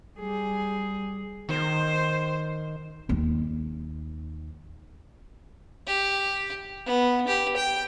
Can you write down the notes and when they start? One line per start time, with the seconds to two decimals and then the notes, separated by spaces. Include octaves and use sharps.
0.19 G3 G#4
1.49 D#3 C5
3.09 D#2 D#4
5.87 G4
6.86 B3
7.27 G4
7.57 G5